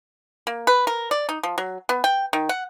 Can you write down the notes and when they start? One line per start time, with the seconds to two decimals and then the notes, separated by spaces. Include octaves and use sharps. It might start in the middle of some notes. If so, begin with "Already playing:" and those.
0.47 A#3
0.67 B4
0.87 A#4
1.11 D5
1.29 D#4
1.43 F3
1.58 F#3
1.89 B3
2.04 G5
2.33 D#3
2.49 F#5